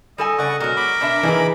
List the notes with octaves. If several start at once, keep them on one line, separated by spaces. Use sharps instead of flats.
G3 A4 D#5 G#5
C#3 D5 F#5 C#6
B2 F#3 G#3 A#4
B5 D6
B2 D4 E5
C3 E3 A#3 D#4 G#4